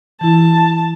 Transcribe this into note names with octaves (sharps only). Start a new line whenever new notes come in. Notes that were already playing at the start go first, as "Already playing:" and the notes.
E3 E4 A5